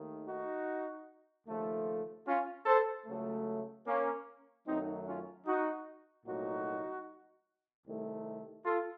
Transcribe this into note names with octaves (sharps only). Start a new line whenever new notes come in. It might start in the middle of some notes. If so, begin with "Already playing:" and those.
Already playing: D#2 D#3 A3
D#4 F#4
D#2 C#3 F3 A3
C#4 F4
A4 C5
C#2 C#3 F#3 A3
A#3 C#4
F#2 D#3 F#3 A3 C4 D#4
C#4 F4
D#4 F#4
C2 A#2 F#3 A3 D#4 F#4
C2 C3 D#3 A3
F4 A4